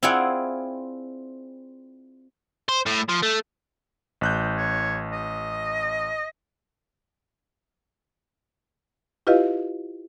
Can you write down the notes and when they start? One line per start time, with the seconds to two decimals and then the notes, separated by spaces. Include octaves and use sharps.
0.03 C4 E4 F4 G#4 D5 F#5
2.69 C5
2.86 A2
3.09 F3
3.23 A3
4.21 A1 F#6 G6
4.57 C#5
5.13 D#5
9.27 E4 F4 G4 B4 D#5 F5